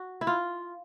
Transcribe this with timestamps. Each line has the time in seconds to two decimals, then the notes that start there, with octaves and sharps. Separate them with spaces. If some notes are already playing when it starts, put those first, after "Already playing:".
Already playing: F#4
0.21 E4
0.27 F4